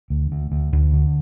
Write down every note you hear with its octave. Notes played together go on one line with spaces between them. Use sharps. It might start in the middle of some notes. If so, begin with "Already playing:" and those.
D2
D2
D2
D2
D3